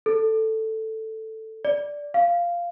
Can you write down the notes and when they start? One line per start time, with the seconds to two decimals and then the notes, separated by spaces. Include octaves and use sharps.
0.06 A4
1.65 D5
2.14 F5